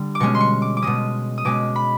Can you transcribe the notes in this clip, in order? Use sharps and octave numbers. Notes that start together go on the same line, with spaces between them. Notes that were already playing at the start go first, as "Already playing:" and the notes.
Already playing: D3 G3
D6
B2 G#3 C#4 C#6
C6
C#6
D6
D6
B2 G#3 C#4 D#6
D#6
B2 G#3 C#4 D6
B5